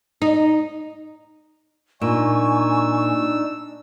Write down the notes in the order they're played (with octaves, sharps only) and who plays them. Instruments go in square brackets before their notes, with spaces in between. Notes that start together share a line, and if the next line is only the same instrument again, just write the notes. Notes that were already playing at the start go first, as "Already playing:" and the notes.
[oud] D#4
[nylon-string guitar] A#2 [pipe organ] D4 D#4 E6 [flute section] G#5 C#6